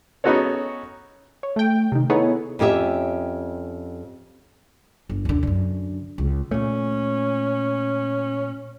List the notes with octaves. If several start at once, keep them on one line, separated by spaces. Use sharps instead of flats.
B3 C#4 D#4 F#4 A4 C#5
C#5
A3 G5
C3 D#3
B3 D#4 E4 G#4 A4 C#5
F2 C#4 G4 A4 E5
G1
D#2 D3
F#2 D3
C#2
A#2 A3 C#4